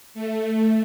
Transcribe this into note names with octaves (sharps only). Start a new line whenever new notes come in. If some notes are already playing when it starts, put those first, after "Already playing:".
A3